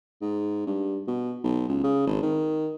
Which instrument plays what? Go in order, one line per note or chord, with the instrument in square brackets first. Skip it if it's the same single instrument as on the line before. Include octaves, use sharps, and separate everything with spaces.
[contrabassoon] G#2
G2
B2
B1
C#2
C#3
G#1
D#3